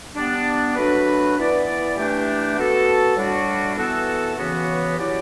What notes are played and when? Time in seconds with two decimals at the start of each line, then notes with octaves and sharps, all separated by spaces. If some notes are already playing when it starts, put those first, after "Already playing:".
0.15 G3 B3 D4
0.76 F#3 A3 D4 F#4 B4
1.36 E3 B3 E4 B4 D5
1.96 E3 A3 D4 G4
2.56 B3 F#4 A4
3.16 A2 G3 D4 F#4
3.77 E3 B3 F#4 A4
4.37 C#3 E3 B3 F#4
4.97 F#3 C#4 E4 G4 D5